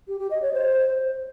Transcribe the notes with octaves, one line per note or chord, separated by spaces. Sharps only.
G4
G4
D#5
C#5
C5